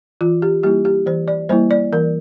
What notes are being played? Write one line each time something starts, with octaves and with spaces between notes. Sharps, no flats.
E3 F4
G4
G3 A#3 E4 G4
G4
E3 C5
D5
G3 A#3 E4 C5
D5
E3 A#4